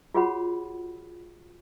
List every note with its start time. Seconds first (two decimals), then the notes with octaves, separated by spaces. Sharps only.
0.15 F4 F#4 G#4 C#5 F#5 B5